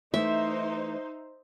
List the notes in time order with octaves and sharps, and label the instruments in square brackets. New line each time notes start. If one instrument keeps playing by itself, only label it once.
[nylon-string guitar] E3 A3 [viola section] D#4 C5 [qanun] E5